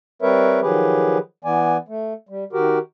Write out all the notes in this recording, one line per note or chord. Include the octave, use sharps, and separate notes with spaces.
G3 C4 A#4 B4 C#5 E5
D#3 F3 F#3 G4 G#4 B4
E3 B3 D5 G#5
A3
G3
D#3 F#4 G4 A#4